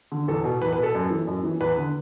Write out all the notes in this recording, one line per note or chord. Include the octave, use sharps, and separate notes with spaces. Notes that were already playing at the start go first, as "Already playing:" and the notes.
D3
E2 A4
B2
E2 B4
B4
B2
A4
F#2
E3
F#2
E3
E2 B4
D3